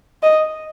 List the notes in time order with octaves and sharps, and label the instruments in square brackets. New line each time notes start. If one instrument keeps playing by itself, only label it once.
[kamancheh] D#5